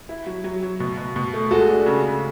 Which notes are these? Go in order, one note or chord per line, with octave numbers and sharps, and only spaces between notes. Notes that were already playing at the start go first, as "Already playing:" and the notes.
E4
F#3
F#3
F#3
B2
B2
B2
A3
G#3 F#4 A4
D4
C#3
C#3